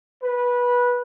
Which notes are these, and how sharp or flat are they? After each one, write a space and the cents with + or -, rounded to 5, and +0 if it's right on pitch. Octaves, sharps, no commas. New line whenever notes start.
B4 -15